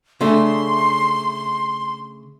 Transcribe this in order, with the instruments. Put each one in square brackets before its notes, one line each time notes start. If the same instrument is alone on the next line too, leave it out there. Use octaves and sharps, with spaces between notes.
[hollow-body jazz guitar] C#3 A3 D4 [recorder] C6